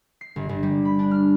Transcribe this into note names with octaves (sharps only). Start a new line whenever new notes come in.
C7
G1
G1
G3
B5
D4
F6